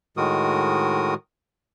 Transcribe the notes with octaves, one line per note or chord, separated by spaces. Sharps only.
A2 D#3 G#3 F#4 A#4 D#6